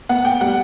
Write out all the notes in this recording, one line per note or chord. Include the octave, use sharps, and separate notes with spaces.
B3 F#5
G5
G3 F#5